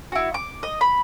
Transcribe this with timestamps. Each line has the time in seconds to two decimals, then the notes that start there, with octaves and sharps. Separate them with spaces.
0.12 E4 F#4
0.34 D6
0.63 D#5
0.81 B5